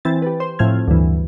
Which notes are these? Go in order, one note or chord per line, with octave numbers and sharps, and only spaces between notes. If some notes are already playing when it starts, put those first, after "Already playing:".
E3 C4 A6
G4 B4
C5
A2 F3 C4 F6 G#6
D2 G2 E3